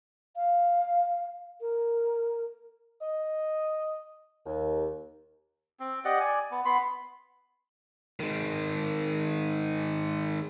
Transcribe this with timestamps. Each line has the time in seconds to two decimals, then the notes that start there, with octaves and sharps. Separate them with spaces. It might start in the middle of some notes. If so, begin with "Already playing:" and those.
0.36 F5
1.61 A#4
3.01 D#5
4.46 D#2
5.80 C4
6.05 G4 D5 D#5 F#5
6.20 D5 G#5
6.51 B3
6.65 B3 B5 C6
8.20 D#3 G#3